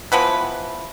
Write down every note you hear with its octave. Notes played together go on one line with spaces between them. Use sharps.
E3 F3 B3 B4